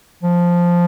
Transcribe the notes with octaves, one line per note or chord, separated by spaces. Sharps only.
F3